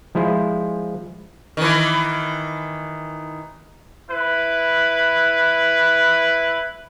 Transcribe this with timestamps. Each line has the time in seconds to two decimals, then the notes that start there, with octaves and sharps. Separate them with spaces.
0.15 F3 G#3 E4 C5
1.57 D#3 E3
4.10 E4 B4